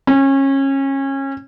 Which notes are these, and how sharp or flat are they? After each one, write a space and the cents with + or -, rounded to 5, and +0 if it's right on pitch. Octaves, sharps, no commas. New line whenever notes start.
C#4 -25